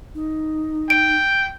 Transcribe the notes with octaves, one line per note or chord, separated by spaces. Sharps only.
D#4
G5 D7